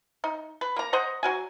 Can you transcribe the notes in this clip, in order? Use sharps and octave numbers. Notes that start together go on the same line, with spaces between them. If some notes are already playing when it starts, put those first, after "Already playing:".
D#4
B4
A#3 A#5
C5 D#5 F#5 A#5
F#3 F#4 G#5